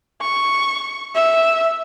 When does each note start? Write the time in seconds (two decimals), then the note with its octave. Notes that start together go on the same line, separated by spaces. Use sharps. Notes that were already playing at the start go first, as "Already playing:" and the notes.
0.21 C#6
1.15 E5